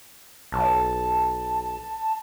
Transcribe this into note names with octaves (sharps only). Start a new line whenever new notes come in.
B1 A5